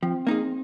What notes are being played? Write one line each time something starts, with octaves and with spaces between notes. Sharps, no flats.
F3 C4
A#3 D#4 G#4